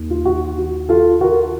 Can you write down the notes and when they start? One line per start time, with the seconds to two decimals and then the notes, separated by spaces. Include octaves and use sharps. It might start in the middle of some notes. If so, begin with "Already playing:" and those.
Already playing: D#2 D#3
0.10 F4
0.25 F#4
0.58 F#4
0.89 F4 A4
1.21 F#4 A#4